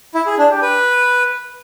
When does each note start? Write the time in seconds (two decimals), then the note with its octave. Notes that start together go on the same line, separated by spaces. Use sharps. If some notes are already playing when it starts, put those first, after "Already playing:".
0.15 E4
0.26 G#4
0.38 D4
0.50 G4
0.62 B4